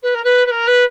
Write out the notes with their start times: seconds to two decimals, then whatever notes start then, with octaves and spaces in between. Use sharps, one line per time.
0.02 B4
0.14 A#4
0.24 B4
0.46 B4
0.50 A#4
0.67 B4